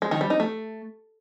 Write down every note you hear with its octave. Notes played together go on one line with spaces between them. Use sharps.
G#3
D#3
G3
D#4
A3